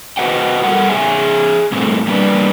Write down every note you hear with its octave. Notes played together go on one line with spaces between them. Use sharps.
F#4 B4 C5 D#5 F#5 G5
F#2 G3 A4 A#4 F#5
G#4 C#5 E5 G#5
G2 A#2 A3 C4
G3 A#3 D4 B4 D5